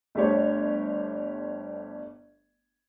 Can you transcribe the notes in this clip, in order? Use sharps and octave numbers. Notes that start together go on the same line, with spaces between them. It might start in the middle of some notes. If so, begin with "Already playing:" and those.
G1 A3 D4 G4 C5 C#5